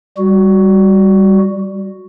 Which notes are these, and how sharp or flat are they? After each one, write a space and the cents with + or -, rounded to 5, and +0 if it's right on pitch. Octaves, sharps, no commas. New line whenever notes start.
G3 +0 F#4 +0